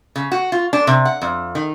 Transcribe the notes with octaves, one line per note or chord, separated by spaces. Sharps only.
C#3
F#4
F4
D4
C3
F#5
F2
D#3